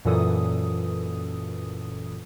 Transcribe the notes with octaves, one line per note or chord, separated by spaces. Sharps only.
F#2 A#2 E3 A4 D#6